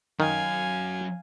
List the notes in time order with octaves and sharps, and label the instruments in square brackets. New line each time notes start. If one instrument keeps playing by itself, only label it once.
[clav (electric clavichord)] D#3 [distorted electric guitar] F#3 C#4 [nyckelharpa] F5 G#5